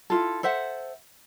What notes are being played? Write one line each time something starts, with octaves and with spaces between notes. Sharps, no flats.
E4 F4 A4
A4 C5 E5 F#5